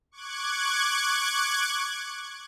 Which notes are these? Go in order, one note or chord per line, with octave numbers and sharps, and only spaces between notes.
C#6 D6 F#6 G#6